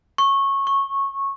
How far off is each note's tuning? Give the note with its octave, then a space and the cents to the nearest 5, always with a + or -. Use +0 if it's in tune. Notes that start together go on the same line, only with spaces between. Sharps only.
C#6 -15
C#6 -10